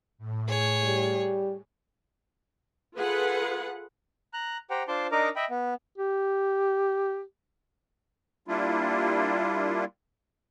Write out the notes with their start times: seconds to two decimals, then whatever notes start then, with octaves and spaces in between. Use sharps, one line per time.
0.18 A2
0.49 G#4 C#5
0.84 G3
2.97 F4 G#4 A4 B4 F#5
4.33 A#5 F#6
4.70 G4 C5 F#5 G5 A#5
4.88 D4 F4 C5 A5 C6 D6
5.12 D4 D#4 A#4 D#5 A#5 D6
5.36 D#5 E5 G5 B5
5.50 B3
5.98 G4
8.48 G3 A#3 D4 E4 F4